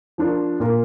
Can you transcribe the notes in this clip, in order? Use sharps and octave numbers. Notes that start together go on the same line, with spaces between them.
F3 D4 F4 A#4
A#2 A#3 F4 A#4